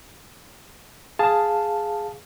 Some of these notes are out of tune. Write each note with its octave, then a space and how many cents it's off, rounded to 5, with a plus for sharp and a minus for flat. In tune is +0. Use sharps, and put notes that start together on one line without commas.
G#4 +0 F5 +0 A5 +0